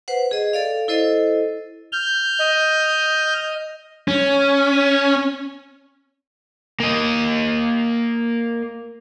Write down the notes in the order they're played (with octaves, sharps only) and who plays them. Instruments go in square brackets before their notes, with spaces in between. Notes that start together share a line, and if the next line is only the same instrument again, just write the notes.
[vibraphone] B4 C5 F#5
G#4 D#5
A4 D5 F5
E4 A4 C5 D#5
[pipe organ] F6 G6
[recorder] D#5
[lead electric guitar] C#4
[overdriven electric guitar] A#3 D#5